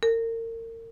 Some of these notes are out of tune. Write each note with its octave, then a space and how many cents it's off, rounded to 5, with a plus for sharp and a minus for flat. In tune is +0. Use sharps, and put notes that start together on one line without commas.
A#4 -35